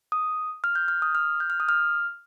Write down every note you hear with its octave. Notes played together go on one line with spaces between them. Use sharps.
D#6
F6
G6
F6
D#6
F6
G6
F6
D#6
F6